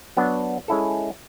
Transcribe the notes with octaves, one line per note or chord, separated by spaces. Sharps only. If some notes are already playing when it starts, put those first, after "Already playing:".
F#3 B3 D4
G#3 C#4 E4 A4